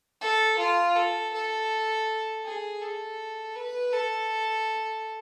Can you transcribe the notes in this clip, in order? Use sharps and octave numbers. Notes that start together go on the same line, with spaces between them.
A4
F4
A4
A4
G#4
A4
B4
A4